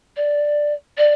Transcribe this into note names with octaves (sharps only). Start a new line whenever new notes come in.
D5
D5